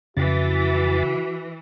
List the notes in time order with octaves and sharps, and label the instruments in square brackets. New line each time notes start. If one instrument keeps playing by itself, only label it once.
[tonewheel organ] F2 A6 [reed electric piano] C#3 [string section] E3 [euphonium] F#4